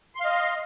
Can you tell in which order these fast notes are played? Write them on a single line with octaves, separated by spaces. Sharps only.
C6 F5 D#5